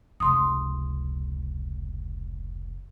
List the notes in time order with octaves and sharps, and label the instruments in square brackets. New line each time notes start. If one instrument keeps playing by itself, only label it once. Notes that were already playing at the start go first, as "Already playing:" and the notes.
[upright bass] F1 C#2 [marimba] C6 D#6